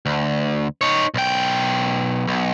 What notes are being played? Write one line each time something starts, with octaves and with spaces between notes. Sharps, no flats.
D2
D#4 C#5
B1 G5
B1